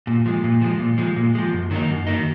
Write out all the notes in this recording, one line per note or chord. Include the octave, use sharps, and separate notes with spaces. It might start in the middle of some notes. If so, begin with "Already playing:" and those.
A#2
F3 G#3
A#2
F3 G#3
A#2
F3 G#3
A#2
F3 G#3
F#2
D#3 F#3 A#3 D#4
F#2
D#3 F#3 A#3 D#4